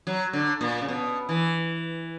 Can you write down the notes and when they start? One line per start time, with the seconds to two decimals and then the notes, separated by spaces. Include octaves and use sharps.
0.07 F#3
0.33 D3
0.61 A#2
0.81 C#3
0.88 B2
1.29 E3